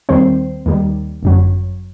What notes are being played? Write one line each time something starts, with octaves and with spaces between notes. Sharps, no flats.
D#2 D#3 G3 C4 C5
D#2 D#3 G3
G1 F#2 F#3